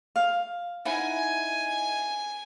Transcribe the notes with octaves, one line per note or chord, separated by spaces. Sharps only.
F5
D#4 E4 F#5 G#5